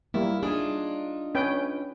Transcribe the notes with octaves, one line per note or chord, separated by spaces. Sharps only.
G3 A#3 E4
D4 D#4 F4 G#4
C#4 B4 G5